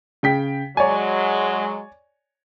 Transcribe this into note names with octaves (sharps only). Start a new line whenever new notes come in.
C#3 G5 B6
F#3 G#3 C#5 D5 G#5